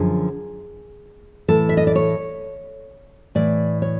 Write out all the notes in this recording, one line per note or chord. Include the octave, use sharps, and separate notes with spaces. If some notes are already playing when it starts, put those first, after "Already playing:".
Already playing: F#2 D3 F3 G#4
A2 E3 A4
E5
D#5
D5
C#5
A2 E3 D5
C#5